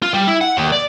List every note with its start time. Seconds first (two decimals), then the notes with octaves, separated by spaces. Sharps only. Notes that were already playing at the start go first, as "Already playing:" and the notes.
0.02 F4
0.14 G3
0.28 E4
0.41 F#5
0.57 D#2
0.72 D5